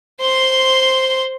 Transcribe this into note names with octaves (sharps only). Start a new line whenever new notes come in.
C5 C6